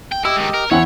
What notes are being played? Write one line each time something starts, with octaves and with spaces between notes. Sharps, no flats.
G5
E4 G4 D#5 E6
G#2 D#3
A#4
E2 C4 C#4 E4 C#5 F#5